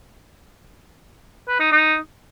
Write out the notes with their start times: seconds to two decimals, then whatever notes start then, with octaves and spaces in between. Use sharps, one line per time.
1.48 B4
1.60 D#4
1.72 D#4